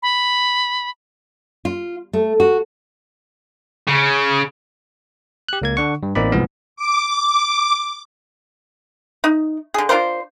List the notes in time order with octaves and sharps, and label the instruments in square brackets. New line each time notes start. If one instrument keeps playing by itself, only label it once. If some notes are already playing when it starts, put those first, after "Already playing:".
[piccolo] B5
[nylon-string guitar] F4
A3
F#4
[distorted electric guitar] C#3
[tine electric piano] G4 F#6
C#2 A#3 G#6
D3 D4 F#5 C#6
G2
A1 A#3 C4 D#4 D5 B5
C2 G#2 E3 F3 B3
[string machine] D6
[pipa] D#4
D3 G#4
D4 F4 A#4 C5